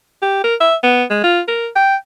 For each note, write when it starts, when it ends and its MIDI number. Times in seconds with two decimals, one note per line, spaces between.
0.22 0.41 67
0.44 0.55 70
0.61 0.75 76
0.83 1.04 59
1.10 1.20 56
1.23 1.40 65
1.48 1.68 70
1.76 1.96 79